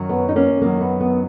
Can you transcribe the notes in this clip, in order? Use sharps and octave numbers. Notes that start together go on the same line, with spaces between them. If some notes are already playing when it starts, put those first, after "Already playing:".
Already playing: F#2 D#3 F#3
B3
D#4
A#3 C#4
F#2 D#3 F#3 A#3
B3
B3